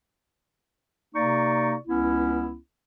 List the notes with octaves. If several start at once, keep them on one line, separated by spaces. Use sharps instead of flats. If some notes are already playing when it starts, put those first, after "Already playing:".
C3 A#3 D#4 D5 C#6
C#2 B3 C#4 E4